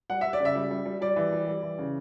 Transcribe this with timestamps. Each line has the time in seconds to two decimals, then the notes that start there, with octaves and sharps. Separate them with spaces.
0.10 G3 F#5
0.21 G3 E5
0.33 D5
0.40 C#3
0.45 E5
0.55 G3
0.71 G3
0.85 G3
1.01 G3 D5
1.16 E3
1.32 G3
1.48 G3
1.63 E3
1.78 C#3